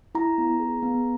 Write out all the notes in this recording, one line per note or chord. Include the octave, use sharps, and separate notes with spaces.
E4 A#5
B3
G#4
B3